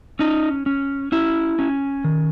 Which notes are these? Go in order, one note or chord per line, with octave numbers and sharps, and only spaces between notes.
C#4 D#4
C#4
C#4 E4
C#4
D#3